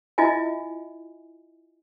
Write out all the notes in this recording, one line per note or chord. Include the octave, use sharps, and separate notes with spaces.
E4 F4 D#5 E5 G#5